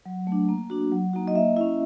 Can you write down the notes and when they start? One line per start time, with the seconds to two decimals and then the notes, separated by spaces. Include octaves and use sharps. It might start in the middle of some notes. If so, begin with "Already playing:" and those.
0.06 F#3
0.27 A3 D4
0.49 A#3
0.70 D4 F#4
0.92 F#3
1.13 A#3 D#4 F#4
1.28 D#5
1.34 A#3 E5
1.56 C#4 E4 E5